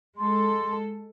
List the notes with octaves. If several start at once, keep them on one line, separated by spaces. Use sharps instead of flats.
G#3 A4 C6